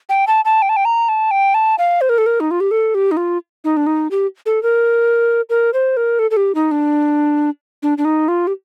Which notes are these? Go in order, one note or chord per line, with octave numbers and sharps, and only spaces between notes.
G5
A5
A5
G5
A5
G5
A#5
A5
G5
A5
F5
C5
A#4
A4
A#4
D#4
F4
G4
A4
G4
D#4
F4
D#4
D4
D#4
G4
A4
A#4
A#4
C5
A#4
A4
A4
G4
D#4
D4
D4
D4
D#4
F4
G4